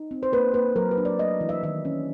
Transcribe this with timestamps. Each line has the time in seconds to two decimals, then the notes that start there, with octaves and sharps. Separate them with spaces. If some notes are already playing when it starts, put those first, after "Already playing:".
Already playing: D#4
0.11 C4
0.23 C5
0.32 A#3 B4
0.54 A#3 B4
0.76 F#3 A#4
0.91 B4
0.98 D4
1.05 D5
1.19 A3 D#5
1.41 E3
1.49 E5
1.63 D#3 E5
1.85 C#4